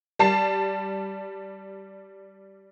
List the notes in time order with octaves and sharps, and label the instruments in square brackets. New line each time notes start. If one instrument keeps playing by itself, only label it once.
[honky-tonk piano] G3 A5 C7